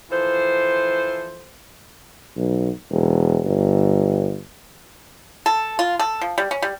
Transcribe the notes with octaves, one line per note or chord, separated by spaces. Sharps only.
E3 F3 A4 C5
B1
E1
G1
A4
F4
A4
F3
G3
C#4
G3